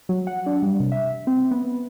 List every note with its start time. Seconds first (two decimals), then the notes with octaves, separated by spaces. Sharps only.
0.09 F#3
0.27 F#5
0.46 D4
0.63 G3
0.80 C3
0.92 E5
1.27 C4
1.51 B3